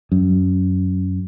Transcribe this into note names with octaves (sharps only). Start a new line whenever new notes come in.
F#2